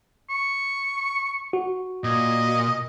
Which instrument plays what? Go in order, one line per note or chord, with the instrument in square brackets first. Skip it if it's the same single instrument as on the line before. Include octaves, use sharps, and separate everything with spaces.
[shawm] C#6
[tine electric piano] F#4
[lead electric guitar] A#2 [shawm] D#5